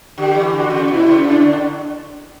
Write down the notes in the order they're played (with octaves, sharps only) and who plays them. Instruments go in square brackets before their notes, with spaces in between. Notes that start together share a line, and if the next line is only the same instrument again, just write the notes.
[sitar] D3 [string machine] G4
[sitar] E3
[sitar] D3 [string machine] F#4
[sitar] C#3
[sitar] B2 [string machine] E4
[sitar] C#3
[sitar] C#3 [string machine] D4
[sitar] D3